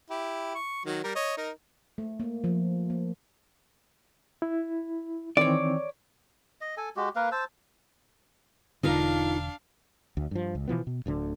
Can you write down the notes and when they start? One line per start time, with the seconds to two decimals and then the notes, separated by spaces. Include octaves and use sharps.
0.10 E4 G4
0.55 C#6
0.86 D#3 F#3
1.04 G3 A#4
1.15 C#5 D#5
1.37 D#4 A#4
1.98 A3
2.20 A#3
2.44 F3
2.90 A#3
4.42 E4
5.37 D#3 E3 C4 C#5 D5
6.61 D#5
6.77 A4 G#5
6.96 G#3 F#4 G4
7.16 A#3 A#4 B4 F5
7.32 C5 A5 E6
8.83 E1 D3 D4 D#4 F4 A#4 F5
10.17 D2
10.31 G2 F3
10.55 C#2
10.68 B2 E3 F3 B3
10.87 B2
11.06 D1 D2 D3